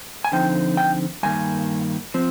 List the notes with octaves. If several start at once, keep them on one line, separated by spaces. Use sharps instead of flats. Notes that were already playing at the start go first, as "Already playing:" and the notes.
G#5
D3 F3 C4 D#4 G5
G5
G2 D#3 A#3 G#5
F3 C4